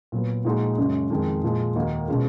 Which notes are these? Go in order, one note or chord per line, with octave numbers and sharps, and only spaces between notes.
A#2 F#3 B3
A#2 F3 G#3 D#4 F#4
F#2 C#3 G#3 C#4 F#4
F2 D#3 G#3
A#2 F3 G#3
D#2 D#3 A#3 D#4 F#4
B2 G#3 C#4 F4